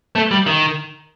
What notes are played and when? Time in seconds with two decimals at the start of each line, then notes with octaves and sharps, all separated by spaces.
0.15 A3
0.31 G3
0.47 D#3